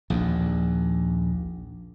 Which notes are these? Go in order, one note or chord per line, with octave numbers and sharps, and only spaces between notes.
A#1 D#2